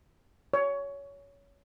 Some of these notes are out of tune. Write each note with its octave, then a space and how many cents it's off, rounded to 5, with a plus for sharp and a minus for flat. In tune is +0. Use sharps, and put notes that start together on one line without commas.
C#5 +20